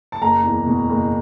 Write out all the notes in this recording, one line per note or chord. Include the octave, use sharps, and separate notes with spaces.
A5
F#1 A#5
E2
B2
F#1